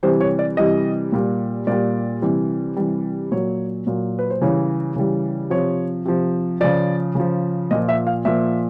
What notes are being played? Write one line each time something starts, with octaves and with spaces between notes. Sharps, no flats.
C3 E3 G3 C5
C#5
D5
C3 E3 G3 D#5
A#2 G3
A#2 G3 D5
C3 E3 G3
C3 E3 G3
A#2 F#3 C#5
A#2 F#3
B4
C5
C#3 E3 G3 C#5
C#3 E3 G3
C3 F3 C#5
C3 F3
C#3 F3 D5
C#3 F3
A#2 F3 D#5
E5
F5
A#2 F3 E5